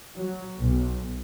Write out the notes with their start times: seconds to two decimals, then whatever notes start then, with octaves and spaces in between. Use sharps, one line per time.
0.16 F#3
0.59 B1